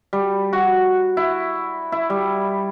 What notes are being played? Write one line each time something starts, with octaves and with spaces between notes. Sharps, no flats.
G3
F#4
E4
E4
G3